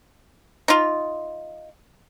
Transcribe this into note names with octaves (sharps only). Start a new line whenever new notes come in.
D#4 F4